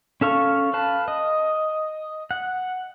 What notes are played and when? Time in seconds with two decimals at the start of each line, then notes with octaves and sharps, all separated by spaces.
0.21 C#4 A4 F5 C#6
0.74 B4 F5 A5
1.08 D#5
2.31 F#5